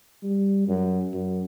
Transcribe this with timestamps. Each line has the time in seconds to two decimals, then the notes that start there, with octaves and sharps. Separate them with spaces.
0.23 G3
0.68 F#2
1.13 F#2